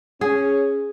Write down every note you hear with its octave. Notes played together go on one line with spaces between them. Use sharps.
C#4 G#4